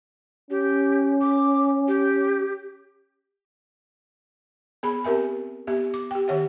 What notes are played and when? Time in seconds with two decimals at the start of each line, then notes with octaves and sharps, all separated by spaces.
0.50 C#4 G4
1.21 D6
1.88 G4
4.83 B3 G#4 B5
5.04 C4 G4 A#4 E5 G#5
5.67 B3 G4 E5
5.94 D6
6.11 G4 G5
6.28 D#3 G4 C#5 E5 F#5